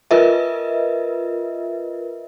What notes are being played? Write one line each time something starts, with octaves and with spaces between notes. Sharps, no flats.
F4 A#4 B4 D#5 E5